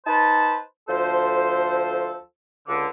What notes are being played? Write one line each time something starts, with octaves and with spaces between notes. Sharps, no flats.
D#4 B4 C5 A5
D2 F3 A4 C5
C#2 D3